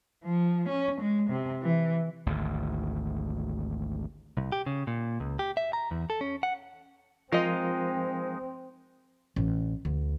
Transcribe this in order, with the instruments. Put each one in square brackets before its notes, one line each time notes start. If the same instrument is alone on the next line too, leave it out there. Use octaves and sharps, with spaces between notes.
[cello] F3
C#4
G#3
C3
E3
[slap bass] G#1 D2
[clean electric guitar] C2
G4
C#3
A#2
C#2
G4
E5
A#5
E2
A4
C#4
F#5
[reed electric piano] F3 A#4 F5 [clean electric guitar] G#3 D#4 [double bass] C4 [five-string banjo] F4 D#5
[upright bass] A1
D2